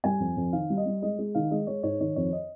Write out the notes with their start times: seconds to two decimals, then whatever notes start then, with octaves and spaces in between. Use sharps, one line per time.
0.04 G3 G#5
0.20 F2
0.37 F2
0.53 D#3 F5
0.70 G3
0.77 D#5
0.86 G3
1.02 G#3 D#5
1.19 G#3
1.35 D#3 F5
1.51 G#3 D#5
1.67 G#3 C#5
1.83 G#2 C#5
2.00 D#3 C#5
2.16 F2 C#5
2.33 D#5